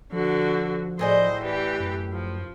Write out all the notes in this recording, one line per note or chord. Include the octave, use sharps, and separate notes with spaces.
D3 F3 F#4
A2 G#4 C5 D5 D#5
E3 G4
F#2
F3